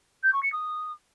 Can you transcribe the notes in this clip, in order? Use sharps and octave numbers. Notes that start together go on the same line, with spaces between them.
G6
C#6
C#7
D#6